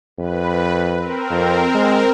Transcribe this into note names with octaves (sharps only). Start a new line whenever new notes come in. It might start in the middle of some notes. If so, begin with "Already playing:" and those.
F2 B4
C4 A#4
F2
G#3